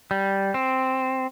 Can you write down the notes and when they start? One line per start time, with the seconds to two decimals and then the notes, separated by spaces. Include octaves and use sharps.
0.11 G3
0.54 C4